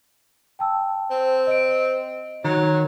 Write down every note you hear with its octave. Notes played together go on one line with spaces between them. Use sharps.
G5 A5 E6
C4
D#5 D7
D#3 F#3 A#5